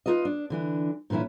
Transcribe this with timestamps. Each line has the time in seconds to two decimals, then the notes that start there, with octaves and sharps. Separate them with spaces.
0.06 D#4 F4 A4 B4 D#5
0.25 D4
0.50 D3 E3 D4
1.10 A#2 D3 E3 C#4 E4